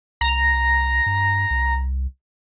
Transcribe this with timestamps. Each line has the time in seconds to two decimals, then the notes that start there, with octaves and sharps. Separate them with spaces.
0.21 C2 A#5
1.06 G2
1.51 C2